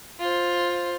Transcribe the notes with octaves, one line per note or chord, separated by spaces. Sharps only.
F4 C5